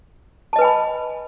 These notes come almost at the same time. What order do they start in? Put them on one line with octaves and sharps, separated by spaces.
A5 D#5 B4 G#5 B5